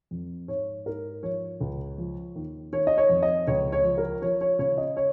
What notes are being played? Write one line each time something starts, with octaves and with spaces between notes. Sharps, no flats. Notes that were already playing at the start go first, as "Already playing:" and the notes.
F2
G#2 C#5
G#2 A#4
F3 C#5
C#2
F3
D#2
D#3 C#5
D#5
C#5
F2
D#5
C#2 C#5
C#5
F3
A#4
F3 C#5
C#5
C#3 C#5
D#5
C#5